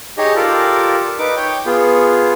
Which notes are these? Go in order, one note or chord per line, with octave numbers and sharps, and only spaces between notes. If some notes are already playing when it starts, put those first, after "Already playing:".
D#4 G4 G#4 C#5 D#5
F4 G4 A4 A#4 D5
D#4 B4 D6
C#5 G5
B3 F4 G#4